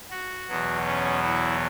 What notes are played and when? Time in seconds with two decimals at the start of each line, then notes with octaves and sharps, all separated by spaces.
0.11 F#4
0.48 E2 B2 F#3
0.85 C#4
1.22 E4